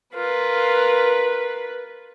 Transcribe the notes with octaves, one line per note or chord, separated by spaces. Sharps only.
F4 A#4 B4